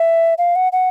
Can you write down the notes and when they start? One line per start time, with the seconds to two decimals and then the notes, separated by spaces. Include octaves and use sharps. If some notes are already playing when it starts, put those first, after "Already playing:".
Already playing: E5
0.38 F5
0.56 F#5
0.72 F#5